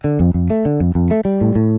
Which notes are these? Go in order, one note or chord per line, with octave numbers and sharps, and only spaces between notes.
D3
F2
F2
A3
D3
F2
F2
A3
G3
A2
A2